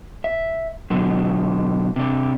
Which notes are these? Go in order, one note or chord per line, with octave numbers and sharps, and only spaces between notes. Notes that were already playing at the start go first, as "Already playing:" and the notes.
E5
B2 D3 F#3
C3 D4